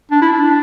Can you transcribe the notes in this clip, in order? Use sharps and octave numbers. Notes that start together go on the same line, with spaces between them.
D4
E4
D4